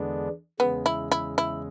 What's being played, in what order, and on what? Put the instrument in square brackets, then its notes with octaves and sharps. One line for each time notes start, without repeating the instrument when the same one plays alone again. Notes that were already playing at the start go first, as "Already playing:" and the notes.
Already playing: [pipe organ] E2 D3 G#3 B3 D4
[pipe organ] E2 C#3 G#3 [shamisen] B3
[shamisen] E4
E4
E4